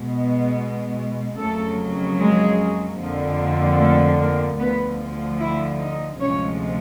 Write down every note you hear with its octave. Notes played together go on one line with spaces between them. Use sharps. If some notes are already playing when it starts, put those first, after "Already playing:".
Already playing: B2 G#3 B3
F2 C#3 F#3 A3 A#3 A4
G#3 G#4
F2 D3 F3 A#3
A3 A4
A#3 A#4
D2 D3 F3 B3 B4
E4 E5
D#4 D#5
D2 C3 F3 G#3 C#4 C#5